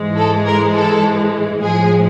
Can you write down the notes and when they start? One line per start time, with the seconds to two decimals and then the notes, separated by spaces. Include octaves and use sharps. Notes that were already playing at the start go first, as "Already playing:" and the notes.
Already playing: G#2 E3 G#3
0.17 A4
0.47 A#4
0.75 A4
1.62 A2 F3 G#3 G#4